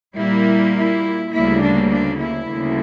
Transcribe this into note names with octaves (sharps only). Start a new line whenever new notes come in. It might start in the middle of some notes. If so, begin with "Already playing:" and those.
A#2 G3 A#3 E4
E4
D2 C#3 G3 A#3 E4
D4
D4
E4
D2 C#3 G3 A#3